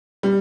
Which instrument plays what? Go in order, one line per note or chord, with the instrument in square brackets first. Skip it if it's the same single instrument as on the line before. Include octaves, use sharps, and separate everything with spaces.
[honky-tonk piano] G3